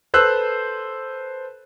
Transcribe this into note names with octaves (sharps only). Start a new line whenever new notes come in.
A4 B4 C5 E6 F#6